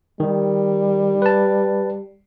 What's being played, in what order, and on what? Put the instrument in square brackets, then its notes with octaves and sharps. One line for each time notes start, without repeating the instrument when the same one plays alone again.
[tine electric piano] D#3 [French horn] G3
[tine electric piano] B4 A5